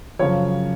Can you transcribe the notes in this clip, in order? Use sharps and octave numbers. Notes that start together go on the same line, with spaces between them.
F#2 C#3 F3 C#5